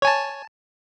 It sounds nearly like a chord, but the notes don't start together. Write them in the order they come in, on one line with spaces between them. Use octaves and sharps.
C#5 G#5 A5